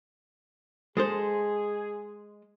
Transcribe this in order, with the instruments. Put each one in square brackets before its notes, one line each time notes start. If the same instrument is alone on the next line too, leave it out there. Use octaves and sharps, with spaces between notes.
[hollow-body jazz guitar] G#3 A4 C5 [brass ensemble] G#4